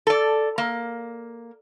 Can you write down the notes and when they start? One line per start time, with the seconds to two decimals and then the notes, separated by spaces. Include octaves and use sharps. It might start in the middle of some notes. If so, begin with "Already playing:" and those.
0.07 A4 D5
0.58 A#3